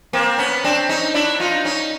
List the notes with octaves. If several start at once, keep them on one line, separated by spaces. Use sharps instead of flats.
A#3 C4
B3 C#4
C4 D4
C#4 D#4
D4 E4
D#4 F4
C#4 D#4